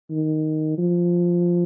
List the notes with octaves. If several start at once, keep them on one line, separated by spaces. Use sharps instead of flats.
D#3
F3